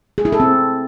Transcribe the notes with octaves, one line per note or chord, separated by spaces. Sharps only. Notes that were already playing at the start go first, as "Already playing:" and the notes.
G#4
E4
A4
C4